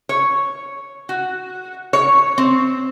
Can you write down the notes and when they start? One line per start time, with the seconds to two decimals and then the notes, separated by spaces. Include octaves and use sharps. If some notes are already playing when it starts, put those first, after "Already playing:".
0.09 C#5
1.09 F#4
1.93 C#5
2.38 C4